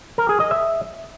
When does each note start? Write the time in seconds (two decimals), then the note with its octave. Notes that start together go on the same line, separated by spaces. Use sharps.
0.18 A#4
0.29 G#4
0.40 D#5
0.51 E5